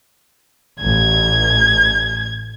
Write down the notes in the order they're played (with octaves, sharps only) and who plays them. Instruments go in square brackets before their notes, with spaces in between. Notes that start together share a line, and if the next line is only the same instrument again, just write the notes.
[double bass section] A1 [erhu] G#6